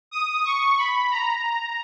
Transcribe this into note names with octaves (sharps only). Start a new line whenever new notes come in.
D#6
C#6
B5
A#5